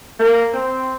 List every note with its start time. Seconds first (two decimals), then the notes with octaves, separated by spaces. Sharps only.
0.20 A#3
0.53 C4